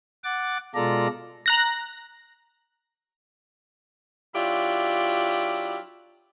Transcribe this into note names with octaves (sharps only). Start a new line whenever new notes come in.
F#5 D6 A6
B2 G#3 F4 A4 D5 A#5
A#5 F#6 A#6
F#3 D4 E4 F4 G4